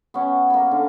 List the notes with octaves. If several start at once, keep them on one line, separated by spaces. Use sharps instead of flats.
B3 C#4
A#3 B5
D3